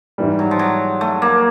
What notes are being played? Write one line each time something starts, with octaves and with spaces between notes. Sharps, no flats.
G#2 E3 G3
F#3
F3
F#3
A3
A#3